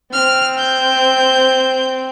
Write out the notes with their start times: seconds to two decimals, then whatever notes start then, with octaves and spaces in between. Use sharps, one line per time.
0.13 C4 F6
0.59 G6